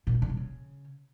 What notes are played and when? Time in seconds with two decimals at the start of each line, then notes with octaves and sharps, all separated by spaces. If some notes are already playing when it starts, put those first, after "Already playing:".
0.07 A#2
0.14 F2
0.22 D3
0.30 E3
0.37 C#3